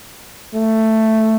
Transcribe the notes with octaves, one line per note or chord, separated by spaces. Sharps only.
A3